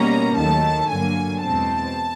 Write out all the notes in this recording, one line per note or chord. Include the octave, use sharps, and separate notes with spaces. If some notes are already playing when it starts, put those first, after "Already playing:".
Already playing: B2 G3 A#3 C#4 A#5
D#2 D#3 F#3 A3 A5
G2 D3 F#3 A#3 G#5
E2 B2 G#3 C4 A5